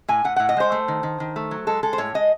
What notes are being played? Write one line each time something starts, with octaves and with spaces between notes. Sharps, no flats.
A2 G#5
A2 F#5
A2 F#5
D#5
G#3 C5
A3
D#3
D#3
D#3
A3
F#3
G#3 A4
G#3 A4
C5
A2 C#5
G#3 D#5